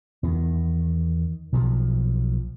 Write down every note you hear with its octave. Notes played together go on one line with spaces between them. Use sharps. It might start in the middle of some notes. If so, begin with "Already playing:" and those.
E2 D#3
B1 A#2 F3